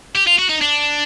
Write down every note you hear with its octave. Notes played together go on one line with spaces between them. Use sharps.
G4
F4
F#4
D#4
D4